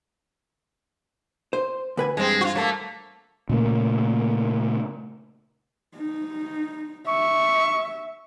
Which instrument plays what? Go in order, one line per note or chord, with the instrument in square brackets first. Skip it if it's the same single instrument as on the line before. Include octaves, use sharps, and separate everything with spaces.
[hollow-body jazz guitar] C5
D2 B4 G#5
[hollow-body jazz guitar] G2 [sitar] G#3 C4
[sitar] F4 F#4
F#3 A3 A#3
[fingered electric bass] A#2 C#3 A3 A#3
[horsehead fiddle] D#4
[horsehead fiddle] E5 [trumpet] C#6